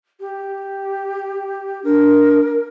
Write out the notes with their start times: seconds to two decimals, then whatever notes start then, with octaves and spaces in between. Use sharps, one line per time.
0.20 G4
1.84 D4 A#4